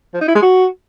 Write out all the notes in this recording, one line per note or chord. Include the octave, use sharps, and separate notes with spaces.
F3
D#4
E4
G#3
F#4